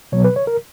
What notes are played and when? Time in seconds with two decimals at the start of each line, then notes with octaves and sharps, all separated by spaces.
0.12 B2 F#3 B3 C#5
0.24 B4
0.36 C#5
0.47 A#4